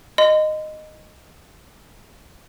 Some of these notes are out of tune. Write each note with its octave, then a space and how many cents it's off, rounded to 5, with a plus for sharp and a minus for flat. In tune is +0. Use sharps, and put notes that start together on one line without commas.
D#5 -10 C6 -35